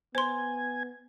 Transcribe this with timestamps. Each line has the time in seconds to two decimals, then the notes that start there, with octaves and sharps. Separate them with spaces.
0.15 B3 C5 G#5 C6